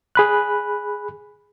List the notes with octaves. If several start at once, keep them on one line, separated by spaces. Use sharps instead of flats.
G#4 B5 F#6